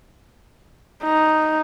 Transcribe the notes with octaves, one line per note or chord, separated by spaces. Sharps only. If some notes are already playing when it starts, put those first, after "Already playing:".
D#4